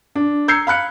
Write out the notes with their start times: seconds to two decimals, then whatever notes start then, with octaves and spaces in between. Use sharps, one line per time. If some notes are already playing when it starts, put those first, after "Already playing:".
0.15 D4
0.48 A#5 E6 G6 G#6 C7 C#7
0.67 F5 B5 F#6 C#7